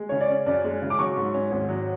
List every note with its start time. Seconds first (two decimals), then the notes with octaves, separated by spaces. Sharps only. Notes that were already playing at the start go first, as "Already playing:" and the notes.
Already playing: G#3
0.09 C#3 C#5
0.21 D5
0.30 C#4
0.46 F#2 D5
0.64 G#3
0.82 C#3
0.90 D6
0.99 F#3 C#6
1.16 G#2
1.34 C#4
1.51 G#1
1.69 F#3